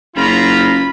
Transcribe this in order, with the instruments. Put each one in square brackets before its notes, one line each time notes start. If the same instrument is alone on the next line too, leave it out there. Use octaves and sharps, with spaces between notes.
[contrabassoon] F#1 [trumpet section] C4 C#5 A#5 [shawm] F4 [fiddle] B5